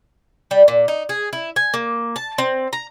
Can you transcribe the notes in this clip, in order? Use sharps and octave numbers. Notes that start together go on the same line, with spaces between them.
G3
A#2
D#4
G#4
E4
G#5
A#3
A5
C4
A#5